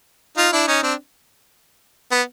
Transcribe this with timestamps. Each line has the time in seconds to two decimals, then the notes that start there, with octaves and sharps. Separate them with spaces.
0.37 D#4 F4
0.52 D4 E4
0.67 C#4 D#4
0.82 C4 D4
2.11 B3